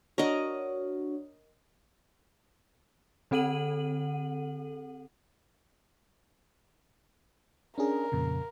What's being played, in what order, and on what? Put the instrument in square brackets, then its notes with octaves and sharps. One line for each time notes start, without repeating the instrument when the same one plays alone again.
[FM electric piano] D4 F#4 C#5 [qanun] A#4 D#5
[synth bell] D3 C4 A4 F#5 D#7 F#7
[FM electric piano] C#4 D4 G#4 [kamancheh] A#4
[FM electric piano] F2 A#2 C#3